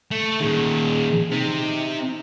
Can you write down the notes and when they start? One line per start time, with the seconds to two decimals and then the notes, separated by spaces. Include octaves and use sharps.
0.11 A3
0.40 A#2 D#3 G#4
1.31 C3 D#4